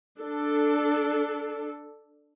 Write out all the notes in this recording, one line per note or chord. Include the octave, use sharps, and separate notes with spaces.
D4 A4